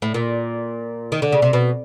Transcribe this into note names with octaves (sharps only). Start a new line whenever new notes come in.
A2
A#2
D#3
D3
C#3
C3
B2